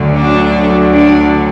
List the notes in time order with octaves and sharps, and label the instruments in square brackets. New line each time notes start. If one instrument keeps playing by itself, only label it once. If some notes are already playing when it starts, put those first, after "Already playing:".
Already playing: [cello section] D2 D3 F#3
D4
D4